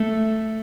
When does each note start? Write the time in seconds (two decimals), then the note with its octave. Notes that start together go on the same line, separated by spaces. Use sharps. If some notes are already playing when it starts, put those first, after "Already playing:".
Already playing: A3